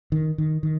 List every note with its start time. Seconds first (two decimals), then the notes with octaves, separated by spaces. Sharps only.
0.12 D#3
0.38 D#3
0.63 D#3